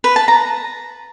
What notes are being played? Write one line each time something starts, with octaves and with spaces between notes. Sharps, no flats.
B4
A5
A#5